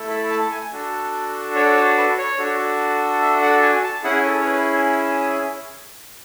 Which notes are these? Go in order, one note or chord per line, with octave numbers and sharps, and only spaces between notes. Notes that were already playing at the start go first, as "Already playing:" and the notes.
Already playing: A3 E4 A4
B5
A5
G#5
D4 F#4 A4
C#5
C#5
B4
C#5
D4 F#4 A4
E5
F#5
G#5
A5
C#4 E4 G#4 F#5
A4
C#5
B4